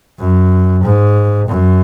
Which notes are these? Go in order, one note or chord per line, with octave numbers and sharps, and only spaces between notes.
F#2
G#2
F#2